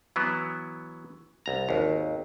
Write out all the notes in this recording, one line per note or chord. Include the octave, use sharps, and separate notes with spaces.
E3 F#3 B3
C2 A#5
G#1 D#2